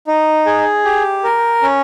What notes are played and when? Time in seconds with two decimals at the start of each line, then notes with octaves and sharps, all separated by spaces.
0.07 D#4
0.46 G#4
0.85 G4
1.24 A#4
1.62 C#4